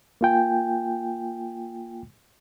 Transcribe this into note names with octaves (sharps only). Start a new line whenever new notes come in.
A#3 F4 G5 G#5